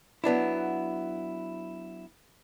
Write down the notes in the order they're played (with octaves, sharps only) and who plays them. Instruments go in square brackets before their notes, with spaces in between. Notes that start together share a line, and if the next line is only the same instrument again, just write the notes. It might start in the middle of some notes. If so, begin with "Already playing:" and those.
[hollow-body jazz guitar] F#3 B3 D4 E4